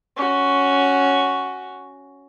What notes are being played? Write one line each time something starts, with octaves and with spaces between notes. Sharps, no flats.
C#4 F#4